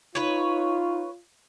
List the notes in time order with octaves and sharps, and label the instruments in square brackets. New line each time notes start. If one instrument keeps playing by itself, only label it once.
[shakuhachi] D#4 [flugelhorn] F4 [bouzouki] B4 C#5